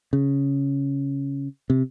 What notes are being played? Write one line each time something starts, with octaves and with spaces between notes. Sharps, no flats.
C#3
C3